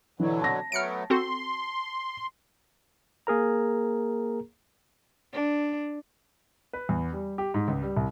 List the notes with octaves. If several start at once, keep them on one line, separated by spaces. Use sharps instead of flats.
B2 D3 E3 F#3
A5 A#6
F#3 A3 B3 F6 C#7 D7
C4 F#4 A4 C6
A#3 G#4 A#4 A#5
D4
B4
E2
G3
G4
G#2
C#2
G3
C2